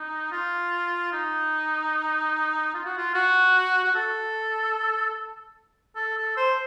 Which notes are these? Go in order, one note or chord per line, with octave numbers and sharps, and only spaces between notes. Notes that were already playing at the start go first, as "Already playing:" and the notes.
Already playing: D#4
F4
D#4
F4
F#4
F4
F#4
F#4
A4
A4
A4
C5